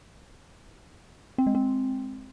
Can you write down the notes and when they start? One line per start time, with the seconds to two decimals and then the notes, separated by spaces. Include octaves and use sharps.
1.38 C4
1.47 G#3
1.55 C4